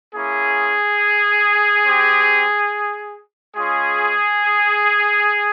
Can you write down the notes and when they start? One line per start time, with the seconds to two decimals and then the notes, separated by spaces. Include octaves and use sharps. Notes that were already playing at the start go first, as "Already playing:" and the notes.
0.15 A#3 C#4 E4 G#4
1.85 C4 G4
3.55 G#3 C#4 F4 G#4